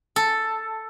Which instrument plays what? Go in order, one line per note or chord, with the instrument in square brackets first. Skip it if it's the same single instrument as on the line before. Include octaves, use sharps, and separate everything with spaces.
[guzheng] A4